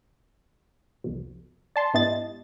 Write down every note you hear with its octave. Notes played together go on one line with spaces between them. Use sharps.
C2 F2 B2
D5 A5 C6
G#2 B3 E4 G4 D#5 A6